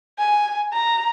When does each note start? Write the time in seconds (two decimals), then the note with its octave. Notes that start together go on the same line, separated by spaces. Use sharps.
0.19 G#5
0.73 A#5